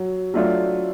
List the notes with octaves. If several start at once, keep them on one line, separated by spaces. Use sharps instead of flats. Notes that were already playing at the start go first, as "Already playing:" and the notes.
Already playing: F#3
F#3 A3 D4 F4